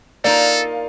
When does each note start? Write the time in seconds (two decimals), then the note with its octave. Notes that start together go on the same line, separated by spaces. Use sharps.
0.24 A#3 D#4 F4 A4 D5